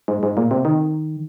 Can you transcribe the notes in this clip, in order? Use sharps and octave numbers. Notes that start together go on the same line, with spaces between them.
G#2
G#2
A#2
C3
D#3